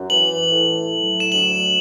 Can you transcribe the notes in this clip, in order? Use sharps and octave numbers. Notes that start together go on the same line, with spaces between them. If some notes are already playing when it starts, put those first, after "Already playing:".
Already playing: F#2
E3 F#7
A2
F#3
E7
D2 F#7